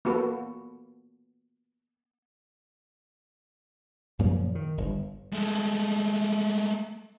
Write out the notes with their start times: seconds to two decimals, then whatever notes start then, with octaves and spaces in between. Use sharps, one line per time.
0.05 A#3 B3 F#4 A4 B4
4.19 F#2 A#2 C#3 F3
4.55 D#3
4.78 G1
5.33 G#3 A3